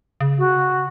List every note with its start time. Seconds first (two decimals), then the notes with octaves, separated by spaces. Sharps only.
0.21 C#3
0.39 F#4